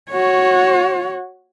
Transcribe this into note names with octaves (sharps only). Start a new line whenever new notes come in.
F#4 C#5